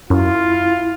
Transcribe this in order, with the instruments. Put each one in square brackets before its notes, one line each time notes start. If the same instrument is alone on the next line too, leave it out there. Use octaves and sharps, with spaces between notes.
[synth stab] F#2 [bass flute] E4 [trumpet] F4